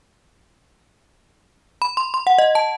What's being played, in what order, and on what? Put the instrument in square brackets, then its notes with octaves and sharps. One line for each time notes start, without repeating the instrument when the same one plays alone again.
[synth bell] B5
C6
C6
F#5
D#5
A5